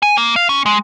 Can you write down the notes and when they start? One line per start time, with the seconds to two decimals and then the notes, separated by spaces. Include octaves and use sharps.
0.03 G#5
0.18 A#3
0.36 F5
0.49 C#4
0.66 G#3